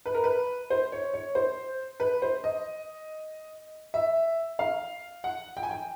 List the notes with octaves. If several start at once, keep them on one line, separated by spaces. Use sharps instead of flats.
B4
A#4
B4
C5
C#5
C#5
C5
B4
C5
D#5
E5
F5
F#5
G5
G#5
G5